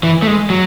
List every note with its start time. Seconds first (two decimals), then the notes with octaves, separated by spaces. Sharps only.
0.03 E3
0.22 A3
0.27 G#3
0.50 F#3